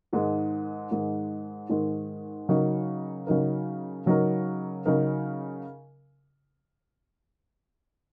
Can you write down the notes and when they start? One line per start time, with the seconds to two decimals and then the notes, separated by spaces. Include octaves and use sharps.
0.13 G#2 D#3 G#3
0.91 G#2 D#3 G#3
1.70 G#2 D#3 G#3
2.49 C#3 F#3 D#4 A#4
3.27 C#3 F#3 D#4 A#4
4.06 C#3 F#3 D#4 A#4
4.85 C#3 F#3 D#4 A#4